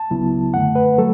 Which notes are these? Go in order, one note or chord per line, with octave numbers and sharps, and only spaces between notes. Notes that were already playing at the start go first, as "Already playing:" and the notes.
Already playing: A5
C#2 C#3 F#3 B3 E4
F#2 D3 A3 F#5
B4
F#3 A3 A4